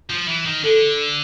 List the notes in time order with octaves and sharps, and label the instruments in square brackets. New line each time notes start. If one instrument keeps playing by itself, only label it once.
[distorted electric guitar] F3
E3
D#3
[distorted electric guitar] D3 [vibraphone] A4